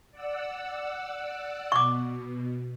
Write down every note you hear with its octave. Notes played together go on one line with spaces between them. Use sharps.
D5 F#5 E6
B2 C#6 D6